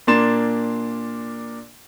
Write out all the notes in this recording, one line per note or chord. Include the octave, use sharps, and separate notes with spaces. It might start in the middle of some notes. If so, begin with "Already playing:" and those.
A#2 A#3 D4 C6 A6 E7